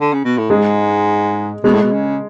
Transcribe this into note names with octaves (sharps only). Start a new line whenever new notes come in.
D3
C#3
B2
A2
G#2 G#3
B2 G#3
A2
B2
C#3